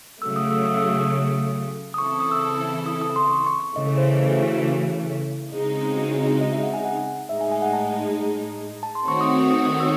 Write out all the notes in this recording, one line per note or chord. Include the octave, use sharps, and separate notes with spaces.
C#3 F#3 A3 E6
D#6
E6
D#6
E6
D#6
D#6
C#3 E3 C4 E4 A4 C#6
C#6
D#6
E6
D#6
D#6
C6
C#6
C#6
C#6
C#3 E3 A3 D#5
A4
C5
C5
A4
F#4
E4
F#4
E4
C#3 G#3 C4 D#4
F#4
E4
F#4
D#5
E5
F#5
G#5
F#5
A2 G#3 D#4 E5
G#5
G#5
F#5
A5
A5
C6
D#3 A3 C4 F#4 C#5 C#6
D#6
D#6
D#6
E6